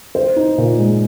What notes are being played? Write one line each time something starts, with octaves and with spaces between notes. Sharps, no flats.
C5
D#4
A#2
G#3